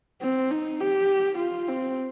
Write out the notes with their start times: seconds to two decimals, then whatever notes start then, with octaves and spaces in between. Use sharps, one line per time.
0.21 C4
0.51 D#4
0.81 G4
1.39 F4
1.68 C4